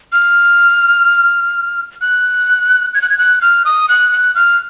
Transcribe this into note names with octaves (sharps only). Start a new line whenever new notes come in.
F6
F#6
G#6
F#6
G#6
F#6
F6
D#6
F#6
F#6
F6